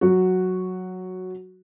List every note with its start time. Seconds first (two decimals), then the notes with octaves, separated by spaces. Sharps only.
0.01 F#3 F#4